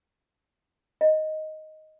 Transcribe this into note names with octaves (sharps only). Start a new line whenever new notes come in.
D#5